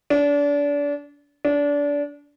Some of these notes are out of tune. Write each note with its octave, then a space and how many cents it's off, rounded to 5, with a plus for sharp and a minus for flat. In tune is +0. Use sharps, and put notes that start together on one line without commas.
D4 -30
D4 -25